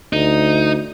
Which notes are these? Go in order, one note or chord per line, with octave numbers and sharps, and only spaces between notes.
D2 D#4